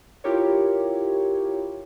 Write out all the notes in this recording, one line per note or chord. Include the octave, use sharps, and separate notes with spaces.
E4 F4 G4 A#4 C#5